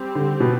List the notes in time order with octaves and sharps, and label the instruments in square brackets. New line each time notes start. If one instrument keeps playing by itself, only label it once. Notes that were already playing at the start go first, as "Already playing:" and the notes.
Already playing: [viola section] G3 C4 G4
[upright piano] D3
B2